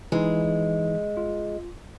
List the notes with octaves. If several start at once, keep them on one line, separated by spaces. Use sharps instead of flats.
E3 G#3 D#4
F4